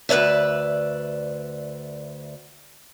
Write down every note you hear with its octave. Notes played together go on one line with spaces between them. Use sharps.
D2 B4 C#5 D5 E5